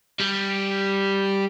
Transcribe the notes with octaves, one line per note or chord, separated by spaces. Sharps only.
G3